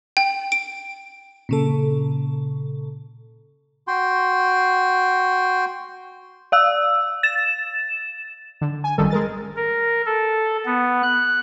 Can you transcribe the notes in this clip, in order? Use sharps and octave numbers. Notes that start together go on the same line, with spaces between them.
G5
D7
A#2 C#3 A4
F#4 G5 C6
D5 F5 E6
A6 E7
D3
G#5
G#1 F#2 D#3 G3 A4
G#3 A#4 A6
A#4
A4
B3
F#6